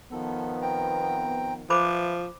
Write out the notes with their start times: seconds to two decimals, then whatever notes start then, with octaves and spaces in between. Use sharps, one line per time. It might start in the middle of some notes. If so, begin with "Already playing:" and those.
0.12 D#3 F3 B3 A4
0.62 C4 G5 A#5
1.70 F3 B4 C5 E5 B5 D6